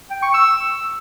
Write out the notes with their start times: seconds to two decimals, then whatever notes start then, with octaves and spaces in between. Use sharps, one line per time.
0.11 G5
0.22 C#6
0.34 E6